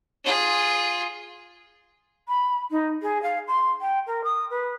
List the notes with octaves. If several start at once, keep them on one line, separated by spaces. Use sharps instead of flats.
F4 G#4
B5
D#4
G#4
F5
C6
G5
A#4
D#6
B4